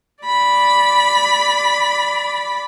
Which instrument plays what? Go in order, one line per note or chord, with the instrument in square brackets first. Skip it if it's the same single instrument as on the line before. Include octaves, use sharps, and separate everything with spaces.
[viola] D5 B5